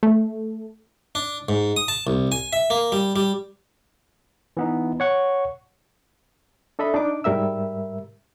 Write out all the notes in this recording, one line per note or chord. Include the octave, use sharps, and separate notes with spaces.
A3
D4
G#2
D#6
A5
C2
G#5
E5
A#3
G3
G3
E3 B3 D#4
C#5 F#5 C#6
D4 A4 D#5 E5 B5
D4 D#4 D6
G#2 G3 A#4 E5 E6